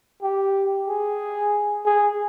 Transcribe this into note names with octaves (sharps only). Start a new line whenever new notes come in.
G4
G#4
G#4